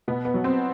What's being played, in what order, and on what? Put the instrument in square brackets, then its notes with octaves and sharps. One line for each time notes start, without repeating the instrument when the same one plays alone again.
[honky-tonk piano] B2 B3
B3
F#3
C4